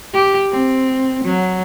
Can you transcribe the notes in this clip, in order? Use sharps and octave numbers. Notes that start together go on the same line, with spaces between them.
G4
C4
F#3